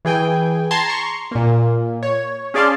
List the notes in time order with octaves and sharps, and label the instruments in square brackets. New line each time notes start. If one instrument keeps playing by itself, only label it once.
[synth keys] E3 G#4 G5 G#5
A5 A#5 C6 G#6
A#5 C6 C#6
A#2 A#3
C#5
C#4 G#4 D5 F5 A5 C6